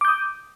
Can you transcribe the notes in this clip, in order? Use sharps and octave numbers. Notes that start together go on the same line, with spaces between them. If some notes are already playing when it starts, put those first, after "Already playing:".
D6 D#6 G6